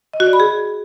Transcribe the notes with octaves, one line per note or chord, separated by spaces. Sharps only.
D#5
F#4
D5
B5
G#4